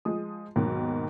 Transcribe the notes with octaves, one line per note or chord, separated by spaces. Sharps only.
F3 G#3 D#6
D#2 G#2 B2 D#3 F#3